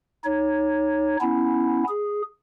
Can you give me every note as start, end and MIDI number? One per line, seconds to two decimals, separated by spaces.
0.24 1.16 63
0.24 1.16 73
1.21 1.84 59
1.21 1.84 61
1.21 1.84 64
1.89 2.22 68